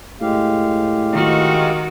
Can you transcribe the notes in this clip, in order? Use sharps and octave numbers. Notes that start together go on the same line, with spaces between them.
A2 G#3 G4 F5
D#3 F#4